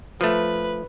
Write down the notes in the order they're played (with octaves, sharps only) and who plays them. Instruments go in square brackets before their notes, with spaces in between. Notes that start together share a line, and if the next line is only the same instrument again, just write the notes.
[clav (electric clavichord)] F3 A3 [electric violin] B4